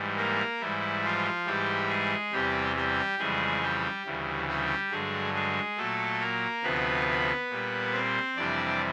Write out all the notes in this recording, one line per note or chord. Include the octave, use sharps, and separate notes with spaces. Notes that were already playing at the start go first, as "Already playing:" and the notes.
Already playing: G#2 E3 G3
A#3 A#4
G#2 E3 G3 E4
F3 F4
G#2 E3 G3 G4
G#3 G#4
E2 C3 E3 G3 G4
G3 G4
F2 C#3 E3 G3 G#3 G#4
G3 G4
D2 C#3 E3 G3
G3 G4
G2 D3 F#3 G#3 G#4
G#3 G#4
A#2 F#3 A3 A4
A#3 A#4
D2 C3 F3 B3 B4
A#2 G3
C4 C5
F2 C3 E3 G3 D4 D5